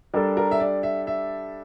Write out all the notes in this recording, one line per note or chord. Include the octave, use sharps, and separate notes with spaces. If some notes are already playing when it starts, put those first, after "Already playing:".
G3 D4 A4 A#4
A#4
E5
D5
E5
E5